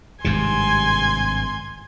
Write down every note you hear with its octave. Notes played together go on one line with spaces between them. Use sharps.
G#1 G2 C3 G#5 C6